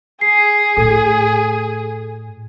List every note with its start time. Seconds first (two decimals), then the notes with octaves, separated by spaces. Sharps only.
0.21 G#4 C7
0.77 A2 A4